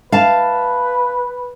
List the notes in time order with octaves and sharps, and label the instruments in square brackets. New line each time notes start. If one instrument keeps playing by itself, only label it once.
[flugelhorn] B4 [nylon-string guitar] F5 A5